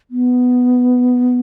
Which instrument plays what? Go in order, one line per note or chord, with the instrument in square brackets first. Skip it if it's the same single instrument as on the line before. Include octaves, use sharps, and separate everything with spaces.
[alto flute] B3